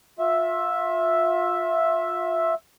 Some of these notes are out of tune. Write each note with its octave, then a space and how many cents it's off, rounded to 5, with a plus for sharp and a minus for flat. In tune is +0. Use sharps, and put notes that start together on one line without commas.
F4 +30 E5 +0